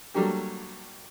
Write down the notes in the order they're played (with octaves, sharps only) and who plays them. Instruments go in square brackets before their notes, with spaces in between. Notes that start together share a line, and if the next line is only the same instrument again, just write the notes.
[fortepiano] F#3 G3 A3 A#3 D4 G4